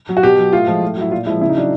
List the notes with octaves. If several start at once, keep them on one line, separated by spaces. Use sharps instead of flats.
F#3
F#4
B2 G4
F#3
A2 F4
F3 G#3
A2
F#3 E4
A#2 F4
F3 G#3 E4
C#3 E4
D#4
F#3 D4